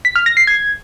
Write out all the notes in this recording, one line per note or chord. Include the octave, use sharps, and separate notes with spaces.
B6
F6
A#6
C7
G#6